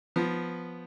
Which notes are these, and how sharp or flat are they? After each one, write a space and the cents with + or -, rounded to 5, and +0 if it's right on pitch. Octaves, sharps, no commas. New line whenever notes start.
F3 +0 B3 +0